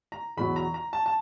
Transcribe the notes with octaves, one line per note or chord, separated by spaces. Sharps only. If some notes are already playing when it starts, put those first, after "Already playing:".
A#5
E2 B2 F#3 B5
A#5
A#5
A5
A5